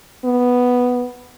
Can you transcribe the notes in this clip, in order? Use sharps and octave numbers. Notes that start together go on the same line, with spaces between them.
B3